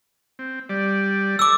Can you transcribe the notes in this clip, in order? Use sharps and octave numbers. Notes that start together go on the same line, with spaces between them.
C4
G3 D5
A4 D6 E6